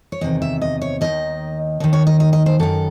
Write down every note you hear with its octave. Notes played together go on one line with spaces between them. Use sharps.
C#5
E2 C3 D#3 D#5
E5
D#5
C#5
D#2 D#3 D#5
D#2 D#3 D#5
C#5
D#5
D#5
D#5
C5
F#2 D#3 A4